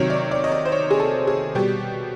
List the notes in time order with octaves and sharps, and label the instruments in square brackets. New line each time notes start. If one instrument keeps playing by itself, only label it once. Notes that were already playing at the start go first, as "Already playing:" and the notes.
Already playing: [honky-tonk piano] C3 D#3 F#3 C#5
D5
D5
D#5
D5
C5
C#5
G#4
A4
G#4
B2 G3 G4